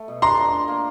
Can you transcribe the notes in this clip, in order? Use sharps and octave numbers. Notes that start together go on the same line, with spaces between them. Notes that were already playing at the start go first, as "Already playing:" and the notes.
Already playing: A3
B2
D4 A#5 C6
F3
D4
A#3